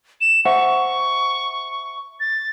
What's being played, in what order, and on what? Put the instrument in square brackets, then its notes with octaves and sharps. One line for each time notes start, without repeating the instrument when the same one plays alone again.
[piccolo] E7
[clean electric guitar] C5 E5 F#5 [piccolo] C#6
[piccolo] A6